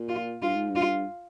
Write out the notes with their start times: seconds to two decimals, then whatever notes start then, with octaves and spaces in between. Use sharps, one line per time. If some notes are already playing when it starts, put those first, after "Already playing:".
Already playing: A#2
0.09 F4
0.42 G2 F4
0.56 G#2
0.70 G2
0.76 F4